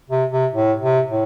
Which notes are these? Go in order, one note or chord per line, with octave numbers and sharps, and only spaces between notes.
C3
C3
A2
C3
A2